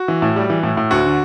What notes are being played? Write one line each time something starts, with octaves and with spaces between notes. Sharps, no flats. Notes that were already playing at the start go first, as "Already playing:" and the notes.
Already playing: F#4
E3
A2
G3
E3
A2
A2
D2 F#4
D3